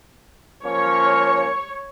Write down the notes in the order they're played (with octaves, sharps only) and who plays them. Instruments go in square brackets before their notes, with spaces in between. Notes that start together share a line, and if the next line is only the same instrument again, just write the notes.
[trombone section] F3 A#3 C#4 [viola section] C#5 [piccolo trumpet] C#6